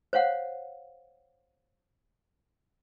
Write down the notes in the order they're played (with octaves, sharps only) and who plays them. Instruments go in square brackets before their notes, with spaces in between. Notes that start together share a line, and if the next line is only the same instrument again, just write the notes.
[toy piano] C5 C#5 F5 F#5